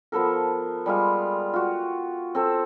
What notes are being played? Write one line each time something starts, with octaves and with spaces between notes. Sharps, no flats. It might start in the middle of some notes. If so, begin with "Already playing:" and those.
F3 B3 A4 A#4
G3 G#3 F4 F5
F4 F#4
C4 A4